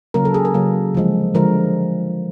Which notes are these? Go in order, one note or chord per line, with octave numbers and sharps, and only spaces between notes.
C#3 F#3 A#3 A#4
A4
G#4
A#4
C#3 F#3 A#3
D3 F3 G#3
D3 F3 G#3 A#4